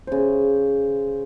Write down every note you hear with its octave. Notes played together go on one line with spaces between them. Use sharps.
C#3 C5